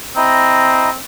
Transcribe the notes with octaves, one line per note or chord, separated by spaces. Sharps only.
C4 E4 D#5 A#5